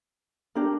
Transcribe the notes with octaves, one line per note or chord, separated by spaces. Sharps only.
D4 G4 A#4